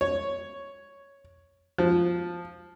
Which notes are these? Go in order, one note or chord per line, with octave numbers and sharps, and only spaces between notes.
C#5
F3